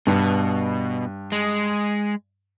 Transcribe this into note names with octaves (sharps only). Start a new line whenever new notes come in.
G2 B2
G#3